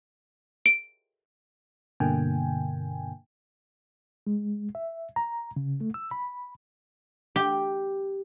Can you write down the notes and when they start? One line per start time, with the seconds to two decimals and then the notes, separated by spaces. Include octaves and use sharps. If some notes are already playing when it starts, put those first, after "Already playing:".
0.66 D7
2.00 G2 B2 D3 A#3 G5 G#5
4.27 G#3
4.75 E5
5.16 A#5
5.56 C#3
5.81 A3
5.94 E6
6.11 B5
7.36 G4